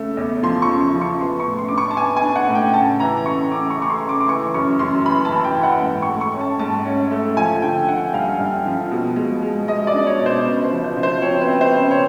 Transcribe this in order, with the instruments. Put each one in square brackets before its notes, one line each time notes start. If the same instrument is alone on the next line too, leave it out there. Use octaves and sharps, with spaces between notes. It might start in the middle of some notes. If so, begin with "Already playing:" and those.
Already playing: [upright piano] C#3 A3
E2
F3 C6
C#6
C#3
F3
C#6
B3 C6
C#6
A2
C6
D4 D6
C#6
A5
B3 G#5
G#5
D4
F#5
A2
G5
C#3 A5
E3 A#5
C#3 C#6
C#3 D6
C#6
A3
C#6
C6
C#3
D6
D6
E3 C#6
F#2 C#6
F#2 C6
E3 B5
A5
E3
G5
E3
F#5
G#2 G5
C#6
A3
C#6
C#4
A5
G#2 A5
C#4
A3
F3 G#5
D3 G5
D3 F#5
G2 F5
G2
F3
B2
G#3
G#3
G#3 D#5
D5
D4
C#5
B2
C5
C#3 B4
C5
F3
C5
F3
C5
C4 C#5
B4
C4
C5
C#3
C#5